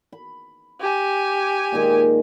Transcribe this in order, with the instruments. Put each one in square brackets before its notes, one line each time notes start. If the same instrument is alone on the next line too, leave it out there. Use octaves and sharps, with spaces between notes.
[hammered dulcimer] B5
[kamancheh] G4 G#5
[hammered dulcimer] A#2 D#3 G#3